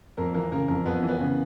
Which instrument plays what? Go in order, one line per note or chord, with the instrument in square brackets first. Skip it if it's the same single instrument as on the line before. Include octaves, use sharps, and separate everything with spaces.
[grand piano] F2 [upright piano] A#3 A#4
[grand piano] E3 [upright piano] A#3 A#4
[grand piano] C#3 [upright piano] A#3 A#4
[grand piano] F2 [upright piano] A#3 A#4
[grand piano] F2 [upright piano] B3 B4
[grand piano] E3
[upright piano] B3 B4
[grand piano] C#3